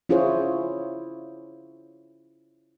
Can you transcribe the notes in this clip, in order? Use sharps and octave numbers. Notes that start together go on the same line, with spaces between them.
C#4 E4 F4 G#4 C5 C#5